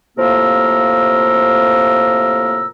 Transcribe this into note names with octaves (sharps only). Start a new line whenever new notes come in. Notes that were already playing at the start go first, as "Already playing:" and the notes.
A2 C3 F3 A#3 A#4 E6